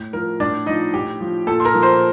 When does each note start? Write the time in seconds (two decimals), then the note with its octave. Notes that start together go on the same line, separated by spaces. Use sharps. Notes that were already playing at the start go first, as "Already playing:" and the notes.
Already playing: A2
0.13 F3 A#4
0.40 A2 D4 D5
0.66 F3 D#4 D#5
0.94 A2 G4 G5
1.21 F3
1.47 A#2 A4 A5
1.60 C6
1.65 A#4 A#5
1.74 F3
1.82 C5 C6